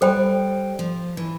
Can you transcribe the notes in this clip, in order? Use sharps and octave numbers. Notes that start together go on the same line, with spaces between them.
G3 A4 C5 G5 B5
F3
E3